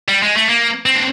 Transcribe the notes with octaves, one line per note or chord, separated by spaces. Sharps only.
G3
G#3
A3
A#3
C4
D4